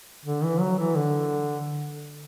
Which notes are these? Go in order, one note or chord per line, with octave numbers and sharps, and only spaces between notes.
D3
E3
F#3
E3
D3